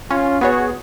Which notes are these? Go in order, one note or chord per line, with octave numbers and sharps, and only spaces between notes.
C#4 F4
B3 F#4 G#4 C#5